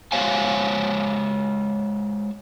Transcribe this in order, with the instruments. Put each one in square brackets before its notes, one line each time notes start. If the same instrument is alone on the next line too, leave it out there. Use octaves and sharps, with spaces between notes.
[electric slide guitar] G#3 F#4 C5 C#5 F5 G#5